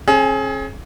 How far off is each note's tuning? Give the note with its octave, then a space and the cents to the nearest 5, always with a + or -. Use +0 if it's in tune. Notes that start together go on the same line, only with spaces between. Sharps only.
C#4 -45 G#4 +30 G#5 -35